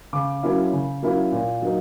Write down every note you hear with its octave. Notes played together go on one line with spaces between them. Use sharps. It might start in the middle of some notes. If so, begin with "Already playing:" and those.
C#3 D6
F#3 A#3 C#4 E4
C#3
F#3 A#3 C#4 E4
A#2
F#3 A#3 D#4